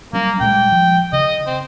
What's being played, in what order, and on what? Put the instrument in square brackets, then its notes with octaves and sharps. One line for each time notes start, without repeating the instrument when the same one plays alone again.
[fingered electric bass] F#3 G3 C#4 [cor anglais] A#3
[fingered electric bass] A#2 G3 G#3 [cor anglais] G5
[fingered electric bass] F3
[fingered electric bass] C#3 [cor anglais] D#5
[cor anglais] C4